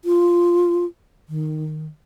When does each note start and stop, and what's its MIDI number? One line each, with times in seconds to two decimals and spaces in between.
0.05 0.85 65
1.29 1.87 51